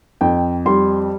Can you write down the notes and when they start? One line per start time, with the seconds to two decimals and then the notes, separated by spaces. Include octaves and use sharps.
0.21 F2 G5
0.66 G3 C6